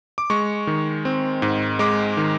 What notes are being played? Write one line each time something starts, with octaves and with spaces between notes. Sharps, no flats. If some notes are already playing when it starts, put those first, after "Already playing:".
D6
G#3 C#6
D#3
C4
G#2
G#3 D6
D#3